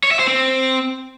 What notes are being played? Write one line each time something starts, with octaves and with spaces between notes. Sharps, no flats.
C#5
E5
C5
C4